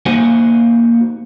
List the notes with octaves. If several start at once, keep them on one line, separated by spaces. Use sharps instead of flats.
A#3 D#4 F#4 C5 F#5 G#5